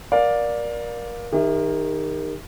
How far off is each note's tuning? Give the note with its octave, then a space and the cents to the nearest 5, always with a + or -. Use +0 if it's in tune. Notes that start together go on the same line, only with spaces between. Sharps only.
A#4 +25 D5 +0 F5 +20
D#3 +0 G4 +45 E5 +0